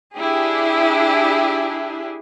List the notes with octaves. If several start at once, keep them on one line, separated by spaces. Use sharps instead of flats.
D4 E4 G4 G#4